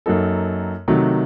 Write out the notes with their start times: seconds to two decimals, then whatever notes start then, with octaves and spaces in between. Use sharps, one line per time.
0.06 F#2 F#3 A#3 D#4 A4
0.88 C3 D#3 F#3 A3